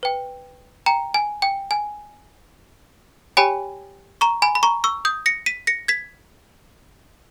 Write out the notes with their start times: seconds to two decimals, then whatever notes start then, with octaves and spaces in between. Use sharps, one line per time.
0.03 B4 G5
0.86 G5 A#5
1.14 G#5
1.42 G5
1.71 G#5
3.37 G4 C#5 G5 G#5 B5
4.21 A#5 C#6
4.42 G#5 B5
4.55 B5
4.63 A#5 C#6
4.84 C#6 E6
5.05 D#6 G6
5.26 A#6 C#7
5.46 B6 D#7
5.67 A#6 C#7
5.88 G#6 B6